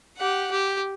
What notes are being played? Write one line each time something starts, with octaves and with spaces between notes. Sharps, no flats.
G4 F#5
G4